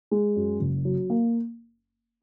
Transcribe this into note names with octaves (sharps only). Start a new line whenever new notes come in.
G#3
F#2
F#1
F#3
A#3